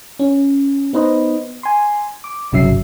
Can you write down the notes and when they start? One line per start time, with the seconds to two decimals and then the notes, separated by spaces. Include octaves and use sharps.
0.19 C#4
0.93 B3 D#4 B4 C5 D#5
1.63 G#5 C6
2.24 D6
2.52 G1 C2 C#3 F#3 E5 C7